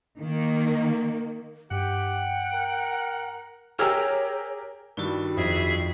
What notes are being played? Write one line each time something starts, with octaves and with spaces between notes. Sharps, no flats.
D#3 A#3
G2 G4 F#5 G5
A#4
G4 G#4 A#4 C#5 G5 E6 F6
G2 D#3 G3 E4 F#4 B5
F2 G#4 E5